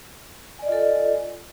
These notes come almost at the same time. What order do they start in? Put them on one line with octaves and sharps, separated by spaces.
G#5 D5 D#5 F4 A4